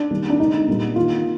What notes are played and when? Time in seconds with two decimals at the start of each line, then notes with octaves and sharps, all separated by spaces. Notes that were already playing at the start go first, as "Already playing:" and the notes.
Already playing: D4
0.10 D#3 G3 A#3
0.30 D4
0.40 D3 G#3 D#4
0.68 A#2 G3 A#3
0.95 D#3 A#3 F4